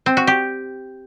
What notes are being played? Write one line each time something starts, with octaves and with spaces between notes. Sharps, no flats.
C4
F#4
G4